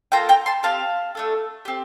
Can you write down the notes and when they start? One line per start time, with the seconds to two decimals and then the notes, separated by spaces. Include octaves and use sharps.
0.12 A#3 F4 A4 G5 A#5
0.29 G5 A#5
0.46 A5 C6
0.63 C4 G4 F5 A5
1.15 A3 D4 A4
1.65 C4 G4